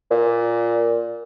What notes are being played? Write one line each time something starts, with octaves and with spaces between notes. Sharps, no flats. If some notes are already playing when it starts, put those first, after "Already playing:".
A#2